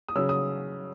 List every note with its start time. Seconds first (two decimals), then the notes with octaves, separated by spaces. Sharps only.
0.09 D#6
0.16 C#3 F#3 C#4 E6
0.29 D#6